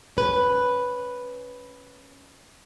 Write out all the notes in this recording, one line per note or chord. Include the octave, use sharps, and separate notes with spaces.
C#4 B4